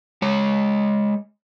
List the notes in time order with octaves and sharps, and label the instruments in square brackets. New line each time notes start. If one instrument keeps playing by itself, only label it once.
[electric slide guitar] G#3 C#5